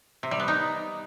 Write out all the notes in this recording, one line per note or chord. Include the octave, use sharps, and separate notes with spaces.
C3
G3
B3
D#4